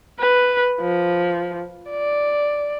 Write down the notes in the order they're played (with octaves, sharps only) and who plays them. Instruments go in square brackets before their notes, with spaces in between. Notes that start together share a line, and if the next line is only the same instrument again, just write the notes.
[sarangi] B4
F3
D5